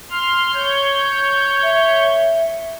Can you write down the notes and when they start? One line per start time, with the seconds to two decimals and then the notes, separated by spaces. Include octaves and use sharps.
0.10 C6 F6
0.54 C#5 G6
1.63 E5